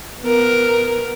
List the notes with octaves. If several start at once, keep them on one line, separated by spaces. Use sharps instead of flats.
B3 A#4